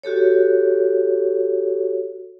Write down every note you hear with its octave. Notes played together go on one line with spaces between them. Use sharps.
F#4 G4 A4 C#5